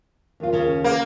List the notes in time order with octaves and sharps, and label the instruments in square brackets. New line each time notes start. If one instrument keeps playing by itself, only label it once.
[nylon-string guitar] D#2 F4
D#2 C#3
[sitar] A#3